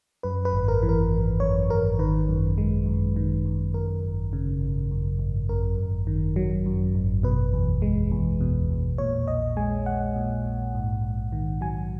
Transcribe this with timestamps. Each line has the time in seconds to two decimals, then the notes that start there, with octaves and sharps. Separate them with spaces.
0.23 F#2 B4
0.45 B4
0.53 G#1
0.68 A#4
0.83 E3
0.89 A#4
1.11 G#1
1.40 F#2 C#5
1.70 G#1 A#4
1.99 D#3 B4
2.29 F#2
2.58 G#3
2.86 F#2
3.16 D#3
3.45 F#2
3.74 F#2 A#4
4.03 G#1
4.33 C#3
4.61 G#1
4.91 F#2
5.19 G#1
5.49 F#2 A#4
5.78 G#1
6.07 D#3
6.36 F#3
6.66 F#2
6.95 G#1
7.23 B2 B4
7.54 E2
7.82 G#3
8.11 E2
8.41 B2
8.70 E2
8.98 A#2 C#5
9.28 A#1 D#5
9.57 G#3 G#5
9.86 A#1 F#5
10.16 A#2
10.45 A#1
10.75 G#2
11.03 A#1
11.32 D#3
11.61 F#3 G#5